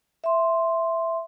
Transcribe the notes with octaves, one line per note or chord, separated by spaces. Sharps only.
E5 C6